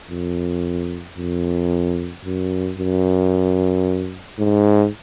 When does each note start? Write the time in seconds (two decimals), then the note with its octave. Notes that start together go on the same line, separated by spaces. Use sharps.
0.10 F2
1.17 F2
2.24 F#2
2.78 F#2
4.38 G#2